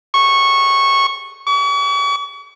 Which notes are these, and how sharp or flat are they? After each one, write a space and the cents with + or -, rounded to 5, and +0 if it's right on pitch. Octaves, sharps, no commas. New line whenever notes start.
C#6 -10
C#6 +45